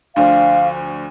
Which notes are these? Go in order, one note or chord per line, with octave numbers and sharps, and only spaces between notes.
D2 D3 F3 F5